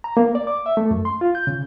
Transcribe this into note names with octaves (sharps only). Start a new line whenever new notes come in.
A#5
A#3
D5
D6
E5
A3
F#2
C6
F4
G6
C#3